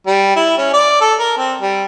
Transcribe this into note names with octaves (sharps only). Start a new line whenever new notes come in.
G3
E4
C#4
D5
A4
A#4
C4
G3